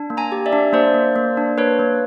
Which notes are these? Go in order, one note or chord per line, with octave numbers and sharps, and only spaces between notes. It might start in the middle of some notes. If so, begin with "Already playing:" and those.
Already playing: D4
A#3
G#5 A#5
G4
D5 E5
D4
A#3 C5 D5
A#3
A#3
D4
A#3 B4 C#5
A#3